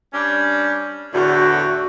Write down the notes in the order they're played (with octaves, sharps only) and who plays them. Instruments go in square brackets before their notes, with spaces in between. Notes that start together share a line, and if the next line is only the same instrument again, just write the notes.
[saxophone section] G3 C#4 D4
[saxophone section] E2 A2 D3 [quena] F#4